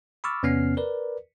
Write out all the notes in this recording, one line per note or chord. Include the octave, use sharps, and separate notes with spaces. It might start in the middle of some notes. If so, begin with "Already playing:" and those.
B5 C#6 D6 E6 F6 A6
E2 C3 B3 C#4 F6 C7
A#4 B4 D5